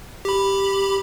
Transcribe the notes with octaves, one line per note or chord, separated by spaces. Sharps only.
G4 B5